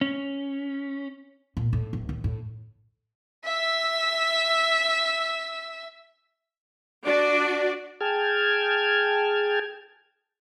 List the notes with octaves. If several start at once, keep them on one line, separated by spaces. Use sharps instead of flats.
C#4
A#2
A2
D1
D#2
A2
E5 E6
D4 F#4 D5
G#4 G5 A5 F6 G#6